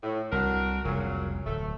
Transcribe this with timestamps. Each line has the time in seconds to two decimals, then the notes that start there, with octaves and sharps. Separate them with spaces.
0.04 A2
0.32 C2 D4 F#4 A#4
0.85 F1 C2 A#2 C#3 F#3
1.46 D1 A3